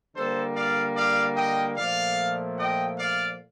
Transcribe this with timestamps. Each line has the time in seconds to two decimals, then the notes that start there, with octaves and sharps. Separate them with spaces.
0.15 D3 G3 A#3 A4 C5
0.56 D5 F5
0.96 D5 F5
1.37 D#5 G5
1.77 A#2 F3 A3 D5 F5
2.59 D#5 G5
2.99 D5 F5